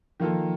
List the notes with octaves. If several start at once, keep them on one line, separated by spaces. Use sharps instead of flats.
D#3 F3 A#3 F4 A4